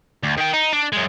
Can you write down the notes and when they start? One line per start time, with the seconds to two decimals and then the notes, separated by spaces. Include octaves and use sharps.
0.23 D2
0.37 D#3 G5
0.53 D#4
0.72 D4
0.92 F#2 G#3